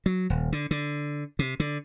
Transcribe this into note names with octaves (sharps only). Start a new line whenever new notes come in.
F#3
D#1
D3
D3
C3
D3